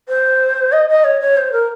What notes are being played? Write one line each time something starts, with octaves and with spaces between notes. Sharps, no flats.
C5
D#5
D#5
C#5
C#5
C5
A#4